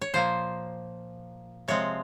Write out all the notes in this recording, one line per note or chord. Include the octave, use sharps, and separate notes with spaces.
C#5
A#2 F3 A#3 C5
C3 F3 G#3 C4 C#5